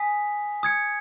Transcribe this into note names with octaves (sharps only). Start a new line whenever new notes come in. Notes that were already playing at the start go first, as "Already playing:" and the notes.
Already playing: G#5 D#6 B6
D#6 G#6 C#7